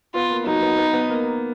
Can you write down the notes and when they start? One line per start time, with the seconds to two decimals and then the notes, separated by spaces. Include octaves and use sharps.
0.14 B3 F4
0.30 A#3
0.46 F#3 D#4
0.62 B3
0.78 B3
0.93 B3
1.10 A#3